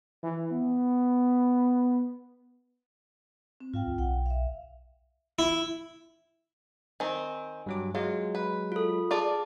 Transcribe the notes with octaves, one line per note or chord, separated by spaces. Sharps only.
E3
B3
C4
G#2 F4 F5 G5
D2
B1 F#5 G5
E5 F5
E4
D#3 C4 G#5
G2 F#3 D6
F#3 G#3 F4
B4
F4 A4
F4 G#4 D5 A5 D6